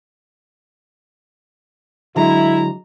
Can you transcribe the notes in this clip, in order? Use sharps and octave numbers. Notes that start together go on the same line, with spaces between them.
D3 F#3 G#3 E4 A#5